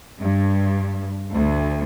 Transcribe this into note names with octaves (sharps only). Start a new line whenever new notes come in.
G2
D2